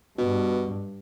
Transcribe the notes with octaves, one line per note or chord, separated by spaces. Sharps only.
G2 B2